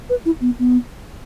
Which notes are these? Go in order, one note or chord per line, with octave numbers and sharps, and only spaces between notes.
B4
E4
B3
B3